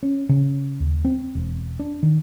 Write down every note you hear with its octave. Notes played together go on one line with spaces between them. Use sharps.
C#4
C#3
D#2
C4
E1
D4
D#3